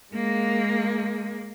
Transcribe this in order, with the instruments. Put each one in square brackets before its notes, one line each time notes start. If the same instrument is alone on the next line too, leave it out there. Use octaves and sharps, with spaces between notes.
[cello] G#3 A#3